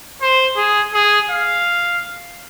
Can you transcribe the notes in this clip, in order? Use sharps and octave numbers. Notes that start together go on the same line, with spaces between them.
C5
G#4
G#4
F5